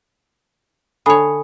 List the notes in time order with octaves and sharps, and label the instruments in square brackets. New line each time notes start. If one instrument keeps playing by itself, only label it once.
[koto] D3 C#5 [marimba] G#5 B5 D#6